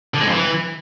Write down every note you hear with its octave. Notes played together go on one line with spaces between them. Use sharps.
D3
G#3
F2
E3